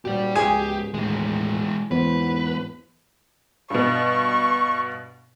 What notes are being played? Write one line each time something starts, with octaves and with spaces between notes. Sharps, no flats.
A#2 F#3 G3 F#4 G4 D5
C#2 G#2 G4 G#4 G#5
D#2 A2 D#3 E3 G#3
E2 G#2 E3 B3 B4 C5
G2 B2 C#6